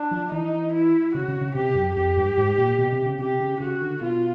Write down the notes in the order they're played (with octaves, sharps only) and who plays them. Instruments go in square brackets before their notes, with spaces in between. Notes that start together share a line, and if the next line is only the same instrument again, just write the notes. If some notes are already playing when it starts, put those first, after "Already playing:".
Already playing: [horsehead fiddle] D4
[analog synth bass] F3
[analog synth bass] E3 [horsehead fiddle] D#4
[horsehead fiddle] E4
[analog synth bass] C#3 [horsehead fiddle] F#4
[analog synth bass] C#3
C#3
[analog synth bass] C3 [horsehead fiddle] G4
[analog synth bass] F#2
[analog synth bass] F2 [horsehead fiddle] G4
[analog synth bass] G2
G#2
A#2
B2
C3
C#3
[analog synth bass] C3 [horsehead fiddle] G4
[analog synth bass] C#3
[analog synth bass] C#3 [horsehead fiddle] F#4
[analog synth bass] D3
[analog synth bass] B2 [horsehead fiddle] F4